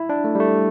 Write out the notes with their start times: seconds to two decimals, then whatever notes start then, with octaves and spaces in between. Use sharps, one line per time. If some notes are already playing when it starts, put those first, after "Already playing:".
Already playing: E4
0.09 D4
0.24 A3
0.35 G3
0.40 A3